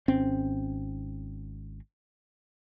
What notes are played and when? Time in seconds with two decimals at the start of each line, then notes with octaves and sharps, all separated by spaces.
0.08 G#1 C4 C#4